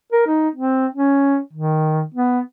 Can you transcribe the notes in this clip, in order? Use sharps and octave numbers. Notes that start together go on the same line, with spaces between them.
A#4
D#4
C4
C#4
D#3
B3